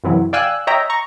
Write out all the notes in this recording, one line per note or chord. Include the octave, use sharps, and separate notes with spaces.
F#2 C3 E3 F#3
D5 F5 G5 G#5 E6 F#6
C#5 D#5 E5 G5 A#5
A#5 C#6